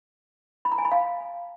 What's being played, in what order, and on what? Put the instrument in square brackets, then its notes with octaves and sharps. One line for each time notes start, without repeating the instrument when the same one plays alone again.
[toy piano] B5
A#5
G#5
B5
F5